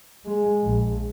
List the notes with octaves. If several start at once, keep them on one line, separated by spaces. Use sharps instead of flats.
G#3
A#1